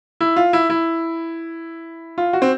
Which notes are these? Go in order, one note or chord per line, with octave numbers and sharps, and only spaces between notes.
E4
F4
E4
E4
F4
F#4
C4